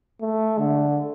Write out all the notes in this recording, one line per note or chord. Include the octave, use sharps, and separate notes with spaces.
A3
D3